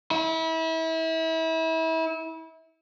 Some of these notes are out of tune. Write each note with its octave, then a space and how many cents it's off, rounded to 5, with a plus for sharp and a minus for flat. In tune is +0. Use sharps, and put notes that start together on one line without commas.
E4 -30